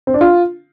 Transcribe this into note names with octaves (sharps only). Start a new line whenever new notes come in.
C4
D4
F4